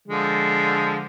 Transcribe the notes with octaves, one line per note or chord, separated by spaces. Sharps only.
D3 F3 G#3